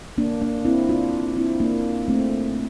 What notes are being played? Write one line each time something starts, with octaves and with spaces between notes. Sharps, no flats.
A#3 D4
A#3 D4
C4 E4
D4 F4
C4 E4
A#3 D4
A3 C4